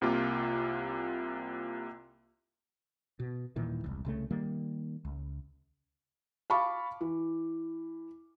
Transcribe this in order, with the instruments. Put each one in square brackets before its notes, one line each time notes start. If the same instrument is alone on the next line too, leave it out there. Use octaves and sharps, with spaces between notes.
[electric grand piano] C2 C3 A#3 F4 D6
[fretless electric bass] B2
D#1 A#2 D#3 E3
E1 C2
C2 C#3 A3
D#3 G3 A#3
C#2
[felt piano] F5 A5 B5 C#6 D6
E3